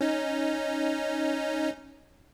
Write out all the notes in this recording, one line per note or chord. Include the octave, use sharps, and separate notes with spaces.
C#4 D#4